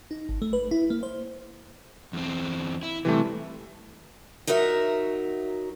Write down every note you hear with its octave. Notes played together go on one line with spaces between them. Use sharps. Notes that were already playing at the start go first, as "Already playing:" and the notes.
D#4
G#1
A3
B4
E4
A#3
C5
E2 C4
E4
C3 E3 G3 A3
F#3 D#4 F#4 A#4 E5